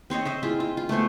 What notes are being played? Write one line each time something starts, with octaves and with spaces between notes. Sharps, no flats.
C4 C5 C#5 D#5
C5 D#5 E5
E4 F4 G#4 E5
F4
F4
A3 B3 C5 G#5